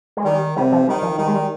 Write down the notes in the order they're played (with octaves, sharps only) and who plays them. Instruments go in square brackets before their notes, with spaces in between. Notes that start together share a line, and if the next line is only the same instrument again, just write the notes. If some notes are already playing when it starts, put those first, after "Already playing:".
[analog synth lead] G#3
[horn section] D#3 [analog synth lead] G3
[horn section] C3 [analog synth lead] G3
[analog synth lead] F3
[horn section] D#3 [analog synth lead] G3
[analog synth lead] F3
[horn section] D#3 [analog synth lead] G3
[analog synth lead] G#3
G3